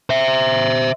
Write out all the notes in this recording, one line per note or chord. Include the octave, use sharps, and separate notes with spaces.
C5 E5